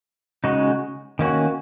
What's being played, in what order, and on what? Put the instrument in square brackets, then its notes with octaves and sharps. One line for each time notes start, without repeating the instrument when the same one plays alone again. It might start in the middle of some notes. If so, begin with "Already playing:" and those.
[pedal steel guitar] C#3 G#3 D#4 F#4
D#3 A#3 C#4 F#4